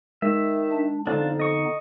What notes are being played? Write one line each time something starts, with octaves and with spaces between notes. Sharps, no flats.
D#3 G#3 E5
D4
F2 D3 B3 D4 D#4 F4 A5
D#5 C#6